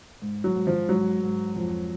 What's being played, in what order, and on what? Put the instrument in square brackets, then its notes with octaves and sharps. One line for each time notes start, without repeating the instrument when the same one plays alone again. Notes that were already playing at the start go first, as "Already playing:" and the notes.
[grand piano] G#2
[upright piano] F#3
[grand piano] G#2
[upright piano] F3
[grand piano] G#2 [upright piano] F#3
[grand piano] G#2
F2